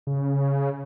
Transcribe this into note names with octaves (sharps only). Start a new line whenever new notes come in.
C#3